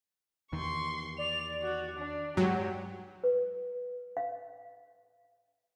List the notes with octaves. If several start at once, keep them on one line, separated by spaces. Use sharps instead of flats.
E2 D#3 C6 C#6
D5 F7
F#4
D4
G2 F#3 G#3 F#4 G4
B4
F5